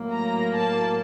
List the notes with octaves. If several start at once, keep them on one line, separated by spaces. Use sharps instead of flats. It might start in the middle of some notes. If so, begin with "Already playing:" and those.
Already playing: A2 F#3 A#3
A#5
A5